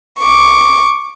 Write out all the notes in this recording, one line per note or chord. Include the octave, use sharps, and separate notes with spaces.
C#6 D6